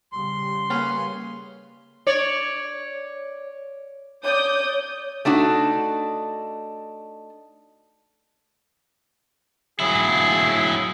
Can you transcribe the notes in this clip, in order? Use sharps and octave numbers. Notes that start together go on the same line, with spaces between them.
C#3 G3 C6
A#3 C#4 G#4 B4
C#5 D5
C#5 D5 D#6 G6
A3 D4 D#4 F#4
F#3 E4 G#4